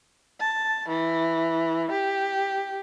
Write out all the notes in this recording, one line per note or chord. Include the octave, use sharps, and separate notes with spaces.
A5
E3
G4